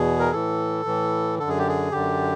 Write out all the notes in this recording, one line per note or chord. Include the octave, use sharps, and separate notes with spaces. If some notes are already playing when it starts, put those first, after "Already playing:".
Already playing: E2 B2 G#4
A#4
A2 E3 A4
A2 E3
F#2 D3 A4
G#4
G4
G#4
F#2 D3 G4